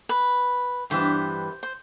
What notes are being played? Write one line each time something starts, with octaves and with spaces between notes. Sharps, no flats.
B4
G2 E3 G3 B3 D4 C5
C5